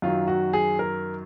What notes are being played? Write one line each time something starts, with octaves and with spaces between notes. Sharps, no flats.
F#2 D#3 F#3 F4
F#4
G#4
A#4